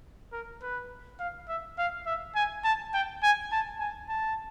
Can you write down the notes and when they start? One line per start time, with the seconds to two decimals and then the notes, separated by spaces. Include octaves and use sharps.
0.33 A#4
0.62 B4
1.20 F5
1.49 E5
1.78 F5
2.06 E5
2.35 G#5
2.64 A5
2.94 G5
3.23 G#5
3.52 A5
3.80 G#5
4.09 A5